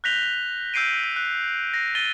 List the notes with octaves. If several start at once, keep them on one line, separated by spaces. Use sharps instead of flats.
F#6 G6 A#6 B6 F7 G7
E6 G6 C7 D7 D#7
F#6
A#6 C7
A6 D#7 G7